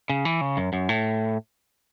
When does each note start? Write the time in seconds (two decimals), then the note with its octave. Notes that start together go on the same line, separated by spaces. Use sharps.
0.10 C#3
0.25 E3
0.41 C#3
0.57 F#2
0.73 F#2
0.89 A2